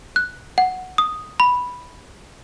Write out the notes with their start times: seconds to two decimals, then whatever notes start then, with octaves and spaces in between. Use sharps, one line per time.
0.16 F#6
0.58 F#5
0.98 D#6
1.40 B5